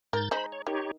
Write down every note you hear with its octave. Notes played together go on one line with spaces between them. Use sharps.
G#2 A#4 G6 A6
G#3 D#4 C5 B5
C#5
D#3 D#4 G4 C#5